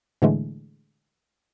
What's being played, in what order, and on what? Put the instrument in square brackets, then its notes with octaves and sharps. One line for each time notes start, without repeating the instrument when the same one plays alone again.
[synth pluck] A2 D3 E3 G#3 A3